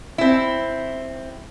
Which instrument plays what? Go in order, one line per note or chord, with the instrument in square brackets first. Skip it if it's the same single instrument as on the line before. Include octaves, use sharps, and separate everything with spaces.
[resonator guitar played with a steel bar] C4 E4